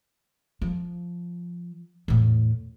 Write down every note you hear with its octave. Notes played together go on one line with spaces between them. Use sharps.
F3
E2 A2